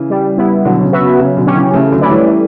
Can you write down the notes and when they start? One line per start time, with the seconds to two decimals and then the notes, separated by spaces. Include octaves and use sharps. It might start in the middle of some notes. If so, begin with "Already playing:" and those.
Already playing: C#3 E3
0.10 G3
0.38 B3 E4
0.65 B2 D3 F#3
0.83 C#3
0.92 B3 F#4 B4 E5
1.01 C#3
1.19 C#3 F#3
1.37 B2 D3
1.47 C#4 G4
1.55 C#3 E3
1.74 C#3 E3 A3
1.92 D3 F#3
2.01 C#4 E4 B4 D5
2.10 E3 G3
2.29 A3